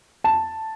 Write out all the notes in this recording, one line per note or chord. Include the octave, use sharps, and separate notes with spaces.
A5